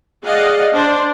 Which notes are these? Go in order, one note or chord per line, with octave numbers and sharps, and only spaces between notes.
G#4 D5 D#5 F5 F#5
D4 C5